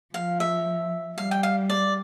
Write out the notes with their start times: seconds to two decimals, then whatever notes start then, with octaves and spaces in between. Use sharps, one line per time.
0.14 F3 F5
0.40 E5
1.18 G3 F5
1.31 G5
1.43 F5
1.70 D5